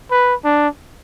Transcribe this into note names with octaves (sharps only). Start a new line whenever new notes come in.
B4
D4